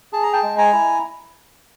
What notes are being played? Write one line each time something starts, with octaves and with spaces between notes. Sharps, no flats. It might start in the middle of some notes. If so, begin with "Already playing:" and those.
G#4 A5
A#5
G5 A5
G#3
G#5 A#5
E4